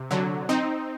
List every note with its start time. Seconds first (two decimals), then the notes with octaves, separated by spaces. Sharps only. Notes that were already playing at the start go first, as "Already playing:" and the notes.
Already playing: C3
0.11 D3 F#3
0.49 C4 D#4